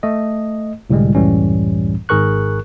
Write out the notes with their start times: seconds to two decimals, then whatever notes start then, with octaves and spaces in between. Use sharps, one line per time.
0.03 A3 D#5
0.90 C2 A2 D3 G3 G#3
1.15 C#2 F#2 A2 E3 G3 C#4
2.09 G#1 G#2 G#4 A#4 C#6 F#6